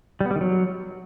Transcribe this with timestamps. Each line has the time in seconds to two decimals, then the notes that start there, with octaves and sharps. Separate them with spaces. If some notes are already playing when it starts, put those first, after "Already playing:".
0.21 G3
0.26 B3
0.31 G3
0.36 D#3
0.41 F#3